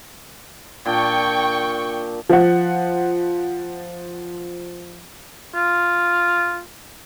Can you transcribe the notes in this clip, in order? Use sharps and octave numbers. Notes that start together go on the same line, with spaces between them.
A#2 D4 G5 C#6
F3 F#5
F4